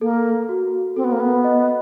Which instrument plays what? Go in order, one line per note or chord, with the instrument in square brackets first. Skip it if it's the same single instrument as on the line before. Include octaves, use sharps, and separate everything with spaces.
[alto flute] A#3 [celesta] A4
[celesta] F#4
[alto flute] C4 [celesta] A4
[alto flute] B3
A#3
B3
[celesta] D#5